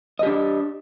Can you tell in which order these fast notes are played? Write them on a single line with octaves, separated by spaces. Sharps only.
D#5 G4 D4